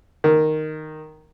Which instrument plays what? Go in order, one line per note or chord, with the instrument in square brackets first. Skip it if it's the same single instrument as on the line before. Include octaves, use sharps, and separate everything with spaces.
[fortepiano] D#3